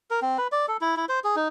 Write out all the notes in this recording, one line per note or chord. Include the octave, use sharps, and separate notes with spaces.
A#4
C4
B4
D5
A4
E4
E4
C5
G#4
D#4